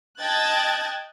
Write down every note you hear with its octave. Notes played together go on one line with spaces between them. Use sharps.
D#5 G5 A5 F#6 G#6 A6